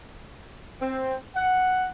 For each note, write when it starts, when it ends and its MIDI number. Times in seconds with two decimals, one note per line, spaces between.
0.81 1.15 60
1.35 1.87 78